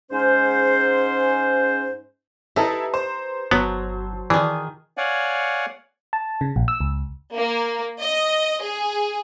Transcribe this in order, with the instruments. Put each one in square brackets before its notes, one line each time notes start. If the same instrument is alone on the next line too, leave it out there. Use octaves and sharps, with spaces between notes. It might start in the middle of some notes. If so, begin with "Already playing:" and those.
[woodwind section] G#2 C#4 C5
[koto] D#4 [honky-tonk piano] E4 A4 E5 [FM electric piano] G4 B4 A#5
[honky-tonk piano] C5
[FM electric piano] G1 A5 [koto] F#3 [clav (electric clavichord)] B3
[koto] D#3 G#4 [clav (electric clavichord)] E3 [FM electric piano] D5 A5 D#6
[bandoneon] C#5 D5 F5 F#5 G#5
[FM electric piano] A5
C#3
A#1
E6
C#2
[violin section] A#3
D#5
G#4